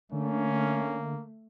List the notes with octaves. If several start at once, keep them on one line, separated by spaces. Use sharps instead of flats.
D3 A3 A#3 C#4